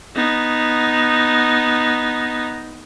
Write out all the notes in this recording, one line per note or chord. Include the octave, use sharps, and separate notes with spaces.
B3 D#4